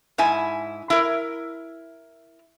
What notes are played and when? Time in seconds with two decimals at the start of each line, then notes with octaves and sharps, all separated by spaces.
0.18 G#2 E4 G#5
0.90 E4 A#4